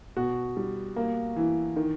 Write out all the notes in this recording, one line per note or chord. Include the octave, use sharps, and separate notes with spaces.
B2 F#4
G3
A#3
E3
D#3